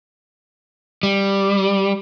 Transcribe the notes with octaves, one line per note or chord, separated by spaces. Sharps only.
G3